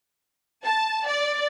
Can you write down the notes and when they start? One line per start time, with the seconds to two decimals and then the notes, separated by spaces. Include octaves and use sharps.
0.63 A5
1.07 D5